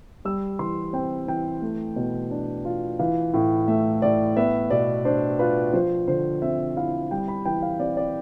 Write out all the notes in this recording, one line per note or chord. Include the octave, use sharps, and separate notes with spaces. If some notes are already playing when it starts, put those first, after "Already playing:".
G3 E6
E3 C6
C4 G5
E3 G5
A3
B2
D4
F4
E3 F5
A2
A3 E5
A2 D5
B3 E5
B2 D5
D4 C5
F4 B4
F3 C5
D3 C5
C4 E5
E4 F5
G3 G5
B5
E3 G5
F5
C4 D5
D5